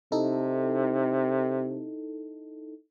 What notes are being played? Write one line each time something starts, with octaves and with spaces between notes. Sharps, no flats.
C3 D#4 E4 A4